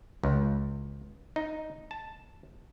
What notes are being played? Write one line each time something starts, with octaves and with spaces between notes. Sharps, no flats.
C#2
D#4
A5